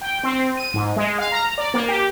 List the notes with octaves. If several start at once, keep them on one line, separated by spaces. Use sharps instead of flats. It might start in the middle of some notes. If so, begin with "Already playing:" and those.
G5
C4
D#7
G#2
G#3
F5
A#5
D5
A#3
G4